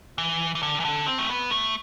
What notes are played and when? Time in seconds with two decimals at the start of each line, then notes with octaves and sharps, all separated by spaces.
0.18 E3
0.55 E3
0.63 D3
0.80 E3
0.85 D3
1.07 C4
1.18 A3
1.29 B3
1.51 A3